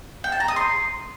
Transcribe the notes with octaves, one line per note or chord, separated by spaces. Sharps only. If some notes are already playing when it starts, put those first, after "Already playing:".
G5
A5
A#5
D#6
C6